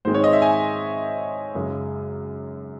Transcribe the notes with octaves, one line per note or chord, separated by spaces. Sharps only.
G#2 D#3 G#3 C4 C5
C#5
D#5
E5
G#5
F#2 C#3 G#3